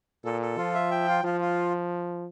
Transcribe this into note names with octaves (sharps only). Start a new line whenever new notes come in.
A#2 A4
A4
F3 F4
E5
G5
F4
F3 F4
F4